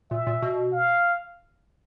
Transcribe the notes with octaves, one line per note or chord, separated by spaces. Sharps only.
A#2 E5
A#2
B2
F5